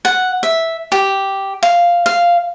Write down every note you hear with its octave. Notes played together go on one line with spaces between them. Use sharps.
F#5
E5
G4
F5
F5